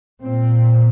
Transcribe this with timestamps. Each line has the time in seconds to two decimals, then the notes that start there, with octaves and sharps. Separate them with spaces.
0.22 A#2 C4